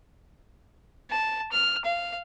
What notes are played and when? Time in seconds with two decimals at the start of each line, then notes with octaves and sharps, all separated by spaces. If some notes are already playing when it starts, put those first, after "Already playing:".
1.10 A5
1.52 F6
1.85 F5